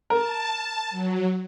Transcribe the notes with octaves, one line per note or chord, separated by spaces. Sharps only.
A#4 A5
F#3